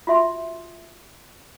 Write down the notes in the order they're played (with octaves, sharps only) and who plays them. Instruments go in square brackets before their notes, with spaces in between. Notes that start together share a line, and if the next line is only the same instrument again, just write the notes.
[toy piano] F4 F#4 E5 C6